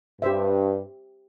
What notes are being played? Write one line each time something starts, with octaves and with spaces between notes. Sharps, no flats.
G2 G4 C5 E5